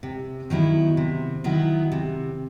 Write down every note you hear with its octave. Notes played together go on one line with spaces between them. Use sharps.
C3
D#3 F#3 B3 E4
C3
D#3 F#3 B3 E4
C3